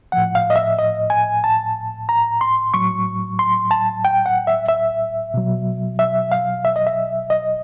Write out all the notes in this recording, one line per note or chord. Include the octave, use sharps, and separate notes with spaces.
A2 F3 F#5
F5
D#5
E5
D#5
G#5
A5
A#5
C6
A2 F#3 C#6
C6
A5
G5
F#5
E5
E5
B2 F#3
E5
F5
E5
D#5
E5
D#5